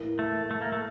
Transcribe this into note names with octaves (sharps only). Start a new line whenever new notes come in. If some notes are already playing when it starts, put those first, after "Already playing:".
Already playing: A2 E3 A#3
A3
A3
A#3
A3